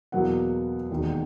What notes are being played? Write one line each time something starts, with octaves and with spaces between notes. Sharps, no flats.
E2 B2 F#3 A#3 F#5
E1 D#2 D#3